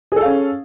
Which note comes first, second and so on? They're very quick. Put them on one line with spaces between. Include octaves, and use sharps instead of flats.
G#4 A4 F5 C#4